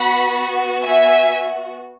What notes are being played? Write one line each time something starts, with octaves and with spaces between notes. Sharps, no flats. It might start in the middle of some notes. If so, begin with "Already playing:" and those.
Already playing: B3 F#4 F#5 B5
E5 G#5